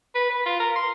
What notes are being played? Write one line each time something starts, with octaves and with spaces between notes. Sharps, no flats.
B4
B4
F4
A#4
C6